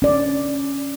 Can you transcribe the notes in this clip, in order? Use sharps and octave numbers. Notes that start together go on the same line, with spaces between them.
C#4 D5